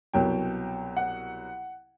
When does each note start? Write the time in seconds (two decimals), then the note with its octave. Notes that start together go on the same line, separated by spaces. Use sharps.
0.13 C2 B2 F#3 G5
0.97 F#5